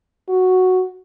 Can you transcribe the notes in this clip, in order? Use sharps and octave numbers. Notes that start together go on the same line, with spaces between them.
F#4